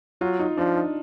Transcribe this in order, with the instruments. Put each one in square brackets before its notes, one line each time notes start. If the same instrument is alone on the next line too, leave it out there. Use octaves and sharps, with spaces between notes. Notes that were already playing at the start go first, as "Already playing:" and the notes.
[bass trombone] F#3 [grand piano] F4
[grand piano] D#4
[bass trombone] F3 [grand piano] D4
[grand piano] D#4